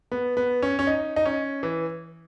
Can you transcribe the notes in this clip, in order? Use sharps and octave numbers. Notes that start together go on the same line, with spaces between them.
B3
B3
C#4
C#4
D#4
D#4
C#4
E3